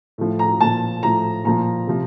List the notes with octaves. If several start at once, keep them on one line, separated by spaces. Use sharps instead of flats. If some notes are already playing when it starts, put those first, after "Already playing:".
A2 F3
A#5
A#2 F3 A5
A2 F3 A#5
A#2 F3 A#5
C3 F3